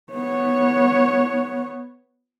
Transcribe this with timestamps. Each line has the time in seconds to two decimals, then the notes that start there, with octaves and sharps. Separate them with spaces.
0.13 B3 C#5